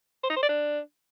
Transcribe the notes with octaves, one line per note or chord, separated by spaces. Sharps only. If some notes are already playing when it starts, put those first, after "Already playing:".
C5
D#4
C5
D5
D4